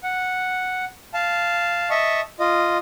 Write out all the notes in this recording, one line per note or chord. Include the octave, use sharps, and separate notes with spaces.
F#5
F5 A5
D#5 E5 A5 C#6
F4 D#5